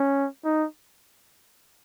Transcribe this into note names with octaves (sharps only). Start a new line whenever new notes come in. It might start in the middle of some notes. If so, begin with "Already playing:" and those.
Already playing: C#4
D#4